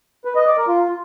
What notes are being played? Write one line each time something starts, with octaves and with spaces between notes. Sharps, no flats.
B4
D#5
D5
A#4
F4